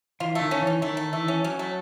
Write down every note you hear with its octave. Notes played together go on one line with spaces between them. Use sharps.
E3 F4
A3
D#3
C#4
E3
C#4
D#3 A3
A3
E3 A3
C#4
F#3 C#4
A3